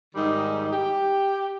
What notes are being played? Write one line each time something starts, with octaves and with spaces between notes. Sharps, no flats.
G#2 D#3 G3 D#4
G4